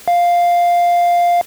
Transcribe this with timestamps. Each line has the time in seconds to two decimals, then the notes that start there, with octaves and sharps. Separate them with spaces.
0.08 F5